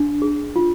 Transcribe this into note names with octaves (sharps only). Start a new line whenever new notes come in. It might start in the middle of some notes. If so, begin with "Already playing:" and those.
Already playing: D4
G#4
F4